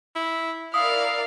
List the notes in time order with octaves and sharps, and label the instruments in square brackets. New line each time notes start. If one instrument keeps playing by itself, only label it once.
[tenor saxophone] E4
[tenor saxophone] E4 [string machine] A#4 D5 [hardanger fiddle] F5 [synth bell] D#6